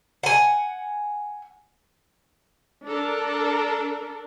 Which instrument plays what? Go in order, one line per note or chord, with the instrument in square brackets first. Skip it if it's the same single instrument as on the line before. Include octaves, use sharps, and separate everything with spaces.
[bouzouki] F#5 G#5
[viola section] D4 A4 A#4